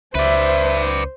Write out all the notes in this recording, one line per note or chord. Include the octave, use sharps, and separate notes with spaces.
C#2 B4 C5 D5 E5